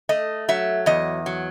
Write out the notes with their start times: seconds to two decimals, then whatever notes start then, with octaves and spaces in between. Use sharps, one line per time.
0.09 A3 D#5
0.49 F#3 E5
0.86 E2 D#5
1.26 F#3